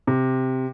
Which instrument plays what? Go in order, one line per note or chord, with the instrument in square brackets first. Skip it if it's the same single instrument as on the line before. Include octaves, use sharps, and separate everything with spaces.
[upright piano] C3